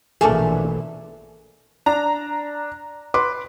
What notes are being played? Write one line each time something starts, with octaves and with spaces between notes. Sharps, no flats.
A#1 B2 E3 A3 A#3 D4 G#4 A4
D4 A#5
B4 C6 D6